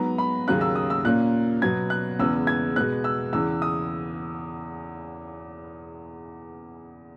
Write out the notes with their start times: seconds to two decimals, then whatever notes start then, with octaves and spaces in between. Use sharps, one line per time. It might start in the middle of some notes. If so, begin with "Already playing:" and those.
Already playing: G#2 F#3 B3 A#5
0.18 B5
0.47 D#2 C#3 F#3 A#3 C#4 F#6
0.61 E6
0.75 D#6
0.90 E6
1.05 A#2 A#3 C#4 F#6
1.62 B2 F#3 B3 G#6
1.90 F#6
2.19 E2 C#3 G#3 B3 E6
2.47 G#6
2.76 B2 G#3 B3 F#6
3.04 E6
3.33 E2 C#3 E3 E6
3.62 D#6